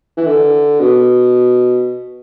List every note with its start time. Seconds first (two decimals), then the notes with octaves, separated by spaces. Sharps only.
0.17 E3
0.27 D3
0.80 B2